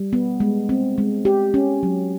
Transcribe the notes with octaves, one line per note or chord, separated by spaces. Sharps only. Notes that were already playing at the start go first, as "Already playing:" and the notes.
Already playing: G3
B3
G#3
C4
G#3
G4
C#4
F#3